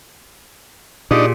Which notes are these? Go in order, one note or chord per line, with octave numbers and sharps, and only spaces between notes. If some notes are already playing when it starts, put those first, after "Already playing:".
A#2 D4 D#4 F4 G4 G#4